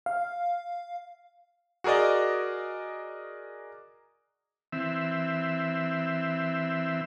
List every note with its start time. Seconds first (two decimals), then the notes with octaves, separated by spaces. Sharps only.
0.06 F5
1.84 F#4 G#4 A#4 D5 D#5
4.72 E3 C4 E5